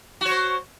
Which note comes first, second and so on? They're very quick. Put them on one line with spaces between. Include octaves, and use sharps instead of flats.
F#4 C#5 C5